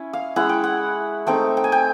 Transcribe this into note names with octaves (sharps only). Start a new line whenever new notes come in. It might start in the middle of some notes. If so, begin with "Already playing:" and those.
Already playing: C#4 E4
F5
G#3 C#4 E4 F#5
G5
F#5
A3 C4 D#4 G5
G5
G#5
G5